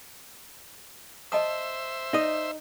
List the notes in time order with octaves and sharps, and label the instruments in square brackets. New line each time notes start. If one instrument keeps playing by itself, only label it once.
[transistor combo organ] C5 E5 [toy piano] D#5 A5 D#6
[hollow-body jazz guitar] D#4 D#5 [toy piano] D5 D#6